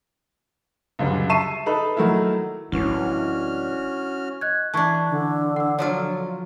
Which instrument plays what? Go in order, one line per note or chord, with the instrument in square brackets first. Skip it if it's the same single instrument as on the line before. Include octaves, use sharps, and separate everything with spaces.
[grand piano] C#2 F#2 D3 G3
E5 A5 C#6 C7 D#7 E7
D#4 A4 B4
D#3 F#3 A3 A#3 E4 A#4
[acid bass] D1 [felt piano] E3 [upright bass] G#3 D4 [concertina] C#4 F#4 F6
[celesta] D#5 F#6 G#6
[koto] E3 D4 [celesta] A5 C#6 G#6
[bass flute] D3
[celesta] F#5 E6
[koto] F3 F#3 F4 [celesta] C#5